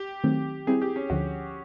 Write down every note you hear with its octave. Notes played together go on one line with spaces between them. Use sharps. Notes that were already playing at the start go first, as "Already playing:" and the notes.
Already playing: G4
D#3 F#3 A3 C4
G3 C4 E4 G#4
G4
C#4
D2 D3 F3 F#4